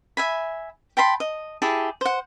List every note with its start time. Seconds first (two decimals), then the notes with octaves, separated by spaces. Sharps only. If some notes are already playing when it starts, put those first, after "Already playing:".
0.17 E5 G#5 B5
0.97 G5 A5 B5 C6
1.20 D#5
1.62 E4 G4 G#4 A5
2.01 C5 F#5